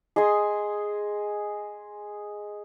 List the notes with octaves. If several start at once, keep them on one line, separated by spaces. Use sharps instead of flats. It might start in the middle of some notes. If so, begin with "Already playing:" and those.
G#4 D#5 G#5 C6